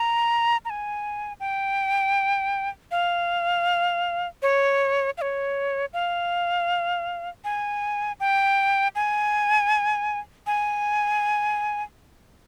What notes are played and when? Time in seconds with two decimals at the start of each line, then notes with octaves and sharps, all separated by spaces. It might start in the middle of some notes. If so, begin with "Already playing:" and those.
Already playing: A#5
0.65 A#5
0.70 G#5
1.40 G5
2.91 F5
4.42 C#5
5.18 F5
5.21 C#5
5.93 F5
7.44 G#5
8.20 G5
8.95 G#5
10.47 G#5